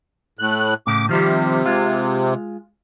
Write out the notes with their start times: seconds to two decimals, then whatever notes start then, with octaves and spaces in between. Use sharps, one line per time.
0.39 A2 F#6
0.87 A2 C#3 D6
1.09 C3 D#3 F3 G3
1.66 G#3 F4